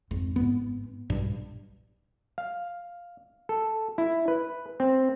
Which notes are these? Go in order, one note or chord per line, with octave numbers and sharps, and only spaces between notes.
G#1 F2 C4
G#2 B3 C4
B1 G2 A#2
F5
A4
E4
B4
C4